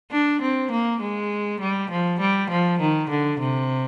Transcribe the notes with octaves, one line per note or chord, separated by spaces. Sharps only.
D4
C4
A#3
G#3
G3
F3
G3
F3
D#3
D3
C3